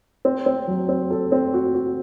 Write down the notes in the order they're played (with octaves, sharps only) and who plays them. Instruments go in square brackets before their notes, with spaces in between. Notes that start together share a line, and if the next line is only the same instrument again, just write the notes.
[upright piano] C4
C4
F#3
C4
A4
C4
F#4
F#4